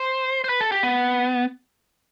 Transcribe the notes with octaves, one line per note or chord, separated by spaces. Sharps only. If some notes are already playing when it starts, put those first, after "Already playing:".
Already playing: C5
C5
B4
A4
G4
B3